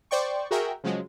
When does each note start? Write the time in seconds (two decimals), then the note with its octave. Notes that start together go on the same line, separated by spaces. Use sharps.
0.11 C5 D5 G5 C#6
0.51 F#4 G#4 A#4 E5 G5
0.84 C#3 F3 F#3 G#3